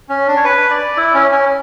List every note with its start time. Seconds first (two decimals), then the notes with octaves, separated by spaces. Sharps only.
0.09 C#4
0.28 D4
0.37 C#5
0.44 B4
0.70 D5
0.97 E4
1.14 C#4
1.31 C#4